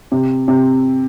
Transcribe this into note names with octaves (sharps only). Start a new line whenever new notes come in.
C3
C3